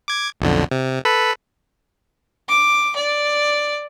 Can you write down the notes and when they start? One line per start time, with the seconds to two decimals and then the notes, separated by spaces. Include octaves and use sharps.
0.08 D6 G#6
0.41 B1 F2 D3
0.71 C3
1.05 A4 B4 B5
2.49 D6
2.96 D5